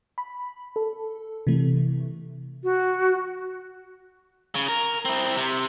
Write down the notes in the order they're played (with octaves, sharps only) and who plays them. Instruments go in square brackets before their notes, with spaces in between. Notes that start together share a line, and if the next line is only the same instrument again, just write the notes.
[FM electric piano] B5
A4
C3 E3 A3
[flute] F#4
[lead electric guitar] C#3
A#4
C4 E4
C3